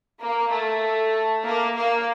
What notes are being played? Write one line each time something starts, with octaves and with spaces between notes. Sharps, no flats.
A#3
A3
A#3
A#3